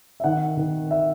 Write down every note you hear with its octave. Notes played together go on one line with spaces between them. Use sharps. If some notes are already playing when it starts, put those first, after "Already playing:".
E5
D#3 F#5
D#3
E5